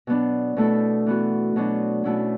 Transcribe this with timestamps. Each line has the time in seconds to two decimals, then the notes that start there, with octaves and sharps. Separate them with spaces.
0.07 B2 F#3 B3 D4
0.57 B2 A3 E4 A4
1.07 E3 B3 F#4
1.56 B2 F#3 B3 D4
2.04 B2 A3 C#4 E4 A4